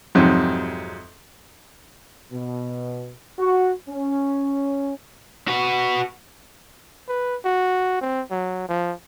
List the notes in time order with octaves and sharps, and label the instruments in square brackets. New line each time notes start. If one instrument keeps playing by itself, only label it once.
[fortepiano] F2 G#2 C3 F#3
[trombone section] B2
F#4
C#4
[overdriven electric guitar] F#4 B4
[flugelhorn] B4
F#4
C4
F#3
F3